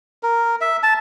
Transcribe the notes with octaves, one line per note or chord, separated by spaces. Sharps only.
A#4
E5
A5